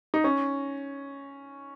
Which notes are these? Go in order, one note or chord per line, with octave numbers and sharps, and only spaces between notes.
D#4
C#4